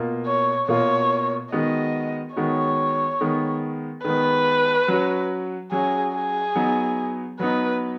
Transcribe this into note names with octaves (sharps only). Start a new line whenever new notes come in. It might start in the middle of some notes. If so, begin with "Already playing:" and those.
Already playing: B2 A#3 F4
C#5
B2 A#3 F4 C#5
D#3 G#3 B3 F#4 D#5
D#3 G#3 B3 F#4 C#5
D#3 G#3 B3
D#3 G#3 B3 B4
F#3 C#4 F#4
F#3 C#4 F#4 G#4
G#4
F#3 B3 D#4
F#3 B3 D#4 B4